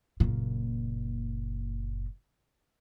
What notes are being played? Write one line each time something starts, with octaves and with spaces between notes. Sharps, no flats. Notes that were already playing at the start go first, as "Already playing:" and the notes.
F#1 A#2